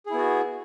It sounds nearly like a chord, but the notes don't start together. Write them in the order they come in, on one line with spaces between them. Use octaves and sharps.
G#4 E4 B3 F#4